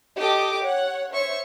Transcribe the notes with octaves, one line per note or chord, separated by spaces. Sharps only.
G4 A4 D#5 D6
C#5 F#5
C5 C#5 E5 C#6